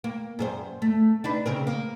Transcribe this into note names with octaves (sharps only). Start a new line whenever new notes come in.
A#3
F#2 G#4 C5
A3
D4 D#4 B4
C#3 C4 A#4
A#3